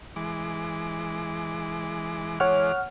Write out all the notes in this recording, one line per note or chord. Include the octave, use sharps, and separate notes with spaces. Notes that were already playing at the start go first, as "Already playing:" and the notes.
E3 G#3 D6
E3 G#3 C#5 F#5 D6 F6